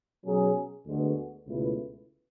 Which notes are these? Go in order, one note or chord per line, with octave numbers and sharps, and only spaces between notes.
B2 F#3 C#4 G#4
D2 D3 G#3 B3 F#4
C#2 B2 A3 E4 B4